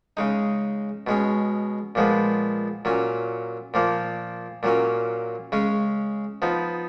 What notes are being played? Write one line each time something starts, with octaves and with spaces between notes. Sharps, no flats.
C#3 G#3 D#4
B2 G#3 C#4
A#2 F3 G#3 B3
A#2 F#3 C#4
A#2 F3 A#3
A#2 F#3 A#3 C#4
C#3 G#3 C#4
F3 B3 D#4